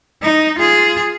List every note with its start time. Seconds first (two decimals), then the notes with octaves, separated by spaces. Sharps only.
0.22 D#4
0.59 F4 G#4